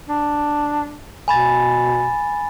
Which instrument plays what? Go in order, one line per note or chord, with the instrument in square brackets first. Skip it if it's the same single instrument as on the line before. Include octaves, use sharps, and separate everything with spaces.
[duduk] D4
[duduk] B2 [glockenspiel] G#5 B5 A6